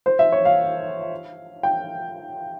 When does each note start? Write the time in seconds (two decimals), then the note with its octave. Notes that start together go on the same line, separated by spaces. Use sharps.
0.06 C5
0.19 E5
0.32 C#5
0.45 F5
1.63 G5